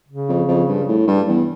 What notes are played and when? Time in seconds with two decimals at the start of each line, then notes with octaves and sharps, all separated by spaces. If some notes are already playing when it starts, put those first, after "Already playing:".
0.08 C#3
0.28 F2
0.48 F2
0.68 G2
0.89 A2
1.08 G2
1.28 E2